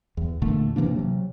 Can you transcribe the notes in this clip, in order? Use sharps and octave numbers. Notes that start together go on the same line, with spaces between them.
E2
E2 A#2 D3 A3
C3 E3 A#3 D4
C3 F#3